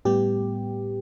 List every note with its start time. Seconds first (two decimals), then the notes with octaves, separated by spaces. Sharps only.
0.05 A2 G3 B3 G4